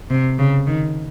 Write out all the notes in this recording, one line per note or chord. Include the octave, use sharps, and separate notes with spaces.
C3
C#3
D#3